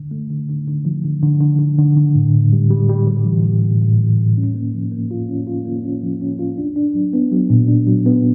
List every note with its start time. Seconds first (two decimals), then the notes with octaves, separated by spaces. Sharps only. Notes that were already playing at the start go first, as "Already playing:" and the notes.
Already playing: D3
0.11 A3
0.30 D3
0.49 D3
0.68 D3
0.85 F3
1.05 D3
1.22 D3
1.41 D3
1.59 D3
1.78 D3
1.97 D3
2.15 A2
2.34 A2
2.52 G3
2.70 G3
2.89 G3
3.07 G3
3.25 E3
3.44 A2
3.63 A2
3.81 A2
3.99 E3
4.18 A2
4.37 C#4
4.55 A#3
4.74 F3
4.91 A#3
5.11 F4
5.29 C#4
5.47 F4
5.65 A#3
5.84 C#4
6.03 F3
6.21 C#4
6.39 F4
6.58 D4
6.76 D4
6.95 F#3
7.13 B3
7.32 F#3
7.50 A#2
7.68 D4
7.87 F#3
8.06 B3